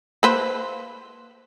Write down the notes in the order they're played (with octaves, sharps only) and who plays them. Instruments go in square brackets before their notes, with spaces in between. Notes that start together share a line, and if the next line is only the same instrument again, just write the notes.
[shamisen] A#3 B4 C5